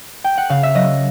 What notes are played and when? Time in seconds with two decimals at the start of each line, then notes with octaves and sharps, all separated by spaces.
0.24 G5
0.38 F#5
0.49 C#3 F5
0.63 E5
0.75 F#3 D#5